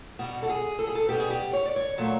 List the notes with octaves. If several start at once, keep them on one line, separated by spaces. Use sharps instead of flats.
B2 G3 F#4
A4
G#4
A4
G#4
A4
B2 G3 G4
G#4
G4
C#5
D5
C#5
A#2 F#3 A3